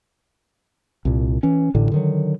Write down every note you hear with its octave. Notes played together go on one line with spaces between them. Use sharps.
C2 A#2
E3 C#4
A1 A2 D3
D3 D#3 F#3